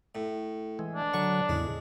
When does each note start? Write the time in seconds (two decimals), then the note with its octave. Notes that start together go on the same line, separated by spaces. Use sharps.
0.15 A2
0.79 E3 G#3
0.95 D4
1.14 D3 F#3 C#6
1.49 E2 A2 C#3 G#3